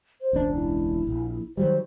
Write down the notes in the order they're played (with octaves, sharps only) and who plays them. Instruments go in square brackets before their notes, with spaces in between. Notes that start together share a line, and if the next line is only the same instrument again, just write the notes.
[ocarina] C5
[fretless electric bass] E1 C#2 D4
[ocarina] E4
[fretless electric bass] A#1
[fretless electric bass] D#3 F#3 G3 [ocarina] C5